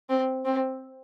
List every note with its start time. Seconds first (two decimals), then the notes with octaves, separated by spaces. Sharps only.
0.09 C4
0.45 C4